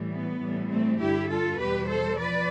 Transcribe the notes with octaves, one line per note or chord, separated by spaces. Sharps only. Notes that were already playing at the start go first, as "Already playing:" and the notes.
Already playing: A2 E3 G3
B3
A2 E3 G3
A3 C4
G2 D3 G3 E4 G4
F4 A4
E2 B2 G3 G4 B4
A4 C5
F3 B4 D5